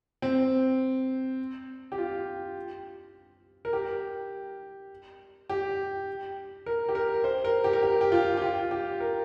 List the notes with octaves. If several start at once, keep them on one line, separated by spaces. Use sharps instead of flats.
C4
G4
F4
A#4
G4
G4
A#4
G4
A#4
C5
A#4
G4
A#4
G4
G4
F4
G4
F4
G4
A#4